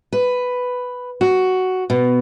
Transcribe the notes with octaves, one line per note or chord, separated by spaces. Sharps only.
B4
F#4
B2